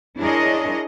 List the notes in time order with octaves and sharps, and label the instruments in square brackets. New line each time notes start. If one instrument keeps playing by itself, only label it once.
[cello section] D4 E4 G#4 A#4 C#5 D#5